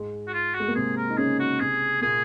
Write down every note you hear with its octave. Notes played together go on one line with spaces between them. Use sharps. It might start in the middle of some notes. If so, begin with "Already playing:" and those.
Already playing: G#2 G#3
F#4
F4
F#4
G#3
A#3
C3 C4 G#4
A#4
D#4
C#3 C#4 G#4
F#4
C3 C4 G#4
A#2 A#3 G#4